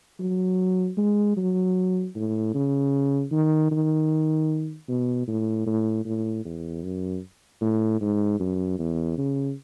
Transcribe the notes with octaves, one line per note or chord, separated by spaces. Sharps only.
F#3
G#3
F#3
A2
C#3
D#3
D#3
B2
A2
A2
A2
E2
F#2
A2
G#2
F#2
E2
C#3